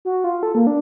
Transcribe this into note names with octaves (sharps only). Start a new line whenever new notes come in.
F#4
F4
A4
A#3
D4